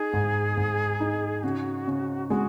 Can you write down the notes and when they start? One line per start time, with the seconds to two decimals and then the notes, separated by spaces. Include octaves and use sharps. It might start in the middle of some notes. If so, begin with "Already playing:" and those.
Already playing: D#4 G#4
0.13 G#2
0.57 G#2
1.00 D#4
1.43 C#3 F#4
1.87 C#3
2.30 G#3 F#4